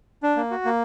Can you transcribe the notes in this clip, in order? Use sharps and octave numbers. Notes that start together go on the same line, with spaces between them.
D4
A#3
F#4
A#3